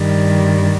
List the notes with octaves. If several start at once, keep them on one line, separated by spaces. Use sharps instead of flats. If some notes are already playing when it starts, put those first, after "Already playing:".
Already playing: G2 D#3 G3